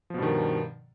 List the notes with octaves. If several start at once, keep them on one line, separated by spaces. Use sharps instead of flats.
G2 B2 D#3 F3